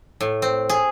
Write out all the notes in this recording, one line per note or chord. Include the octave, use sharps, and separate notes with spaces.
A2
C4
G#4